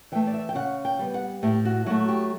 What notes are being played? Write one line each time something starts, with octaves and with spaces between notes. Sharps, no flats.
E3 A3 G5
D5
E5
G5
C#3 F#5
G5
G3 B3
F#5
A2 G4
F#4
F#3 A3 F#4
G4